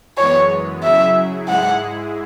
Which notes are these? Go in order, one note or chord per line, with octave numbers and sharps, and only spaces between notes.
F#2 E3 G#3 B3 C#5
C#3 F#3 E4 G#4 E5
G#2 G#3 E4 G#4 F#5